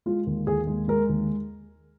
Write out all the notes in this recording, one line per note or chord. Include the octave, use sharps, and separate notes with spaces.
G#3 F4
D#2
D#2 G#4
G#3
G#3 A#4
D#2